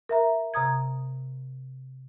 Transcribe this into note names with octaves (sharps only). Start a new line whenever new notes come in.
A#4 E5 A#5
C3 A#5 D#6 G#6